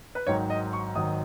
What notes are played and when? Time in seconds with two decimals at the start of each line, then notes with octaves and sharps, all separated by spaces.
0.15 B4
0.27 G#1 G#2 D#3 F#3 C#5
0.50 D#5
0.73 C#6
0.95 G#1 G#2 D#3 F#3 D#6